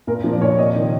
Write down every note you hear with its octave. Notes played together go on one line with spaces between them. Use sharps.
A#2 A#4
F3
D5
A#2 C#5
D5
C3 D#5
D#3